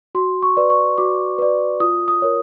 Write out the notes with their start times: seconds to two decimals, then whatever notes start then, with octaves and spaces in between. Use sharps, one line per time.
0.15 F#4 C6
0.42 C#6
0.57 B4 D5
0.70 C#6
0.98 F#4 D6
1.38 B4 D5
1.80 F4 D#6
2.08 D#6
2.22 A#4 C#5